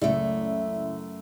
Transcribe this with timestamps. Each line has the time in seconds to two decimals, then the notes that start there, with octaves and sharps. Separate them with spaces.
0.01 C#2 F#2 A3 E4 D5